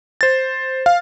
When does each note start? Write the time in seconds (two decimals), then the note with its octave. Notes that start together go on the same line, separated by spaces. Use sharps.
0.21 C5 A6
0.86 F5